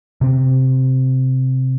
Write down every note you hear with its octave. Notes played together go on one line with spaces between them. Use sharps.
C3 C4